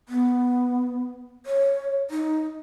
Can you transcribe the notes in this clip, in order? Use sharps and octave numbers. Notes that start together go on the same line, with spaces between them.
B3
C#5
D#4